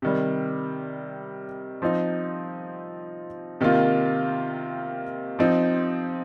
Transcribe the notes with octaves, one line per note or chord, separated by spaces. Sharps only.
C3 D#3 G3
F3 C4 D#4
C3 D#3 A#3 F4
F3 C4 D#4